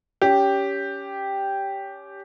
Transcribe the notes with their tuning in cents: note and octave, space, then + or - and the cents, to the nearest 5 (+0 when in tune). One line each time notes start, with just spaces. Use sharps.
C#4 +25 G4 +0